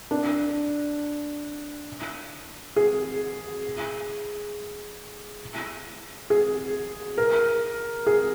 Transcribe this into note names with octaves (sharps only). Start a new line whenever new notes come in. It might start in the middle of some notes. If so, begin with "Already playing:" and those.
D4
G#4
G#4
A#4
G#4